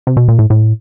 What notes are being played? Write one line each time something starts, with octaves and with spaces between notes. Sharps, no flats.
C3
B2
A#2
A2
A2